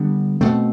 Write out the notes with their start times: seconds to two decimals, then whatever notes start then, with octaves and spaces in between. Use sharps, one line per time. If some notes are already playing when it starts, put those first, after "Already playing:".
Already playing: D3 G3 B3 D4
0.41 B2 A3 C4